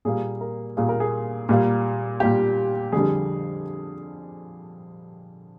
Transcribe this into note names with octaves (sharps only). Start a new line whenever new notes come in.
A#2 G3 A#3 G#4
A#4
A#2 G3 A#3 G#4
A#4
G#4
A#2 G3 A#3
A#2 G3 A#3 G4
F2 D3 G3 G#4